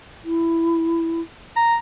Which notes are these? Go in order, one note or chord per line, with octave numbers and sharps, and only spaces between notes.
E4
A#5